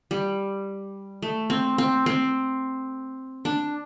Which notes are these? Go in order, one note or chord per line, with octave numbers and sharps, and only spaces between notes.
G3
A3
C4
C4
C4
D4